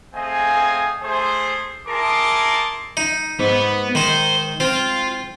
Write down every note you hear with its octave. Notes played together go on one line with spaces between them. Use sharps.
A3 C4 G#4 D#5 F5 G#5
A3 G#4 C5
E4 G#4 A#4 A5 C6 D6
D#4
G#2 B3
D#3 D#4 C5
C4 F4